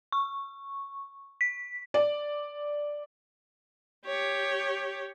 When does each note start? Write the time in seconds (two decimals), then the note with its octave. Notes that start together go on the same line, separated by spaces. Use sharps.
0.12 C#6
1.41 B6
1.94 D5
4.06 G4 C#5